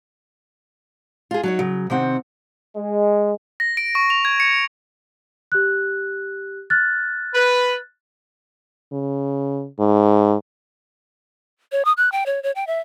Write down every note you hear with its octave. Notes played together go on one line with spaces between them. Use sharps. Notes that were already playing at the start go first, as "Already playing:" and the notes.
F4 G#4
F#3 D#4 C#5
C#3 F#3
C3 D#3 C4 F#5
G#3
A#6
D7
C#6
F7
G#6
C#7
G4 F#6
F6 F#6 A6
B4
C#3
G#2
C#5
D#6
F#6
G5
C#5
C#5
G5
E5